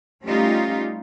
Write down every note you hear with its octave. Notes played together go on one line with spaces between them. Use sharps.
G3 A3 C#4 D#4 F4 G4